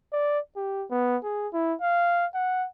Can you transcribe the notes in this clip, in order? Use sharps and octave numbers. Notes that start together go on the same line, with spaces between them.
D5
G4
B3
G#4
E4
F5
F#5